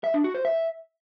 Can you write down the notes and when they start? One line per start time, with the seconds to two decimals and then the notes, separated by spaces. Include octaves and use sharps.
0.04 E5
0.14 D4
0.24 F#4
0.34 C5
0.45 E5